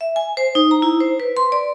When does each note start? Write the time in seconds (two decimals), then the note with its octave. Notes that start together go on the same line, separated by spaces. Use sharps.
0.01 E5
0.16 G#5
0.37 C5
0.55 D#4
0.71 A#5
0.82 E4
1.00 C5
1.20 B4
1.37 C6
1.52 D5